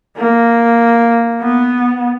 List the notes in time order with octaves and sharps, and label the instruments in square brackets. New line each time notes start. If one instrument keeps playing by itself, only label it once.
[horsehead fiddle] A#3
B3